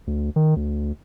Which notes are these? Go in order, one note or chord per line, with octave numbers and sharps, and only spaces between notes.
D2
D#3
D2